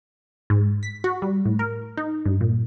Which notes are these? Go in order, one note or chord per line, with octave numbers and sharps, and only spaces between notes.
G#2
B6
F#4
G3
A2
A#4
D#4
G2
A#2